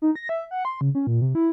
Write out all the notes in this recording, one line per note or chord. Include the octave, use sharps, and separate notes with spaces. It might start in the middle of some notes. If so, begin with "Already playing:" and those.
D#4
A#6
E5
F#5
C6
C#3
C#4
A#2
C3
E4